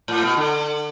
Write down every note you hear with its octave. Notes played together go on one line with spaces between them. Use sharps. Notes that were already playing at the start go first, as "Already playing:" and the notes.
A2
B2
D3